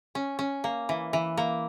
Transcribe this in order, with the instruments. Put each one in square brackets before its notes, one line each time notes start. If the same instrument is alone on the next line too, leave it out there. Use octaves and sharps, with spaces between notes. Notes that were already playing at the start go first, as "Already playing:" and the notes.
[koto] C#4
C#4
A#3
E3
E3
A#3